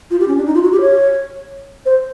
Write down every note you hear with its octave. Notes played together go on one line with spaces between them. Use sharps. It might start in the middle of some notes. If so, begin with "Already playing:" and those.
F4
G4
C#4
D4
D#4
F4
F#4
G4
C#5
C5